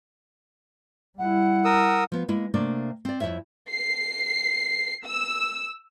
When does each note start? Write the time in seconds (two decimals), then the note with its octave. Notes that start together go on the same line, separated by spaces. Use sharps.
1.19 G3 E4 F#5
1.65 A#4 D#6 E6
2.12 F3 B3
2.28 G#3 A#3 E4
2.54 C3 A3 A#3 D4 D5
3.05 C4 D5
3.21 F2 C#3 E4 C#5 E5
3.70 C7
5.06 E6